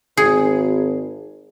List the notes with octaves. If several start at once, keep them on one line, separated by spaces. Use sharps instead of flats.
G#1 G#4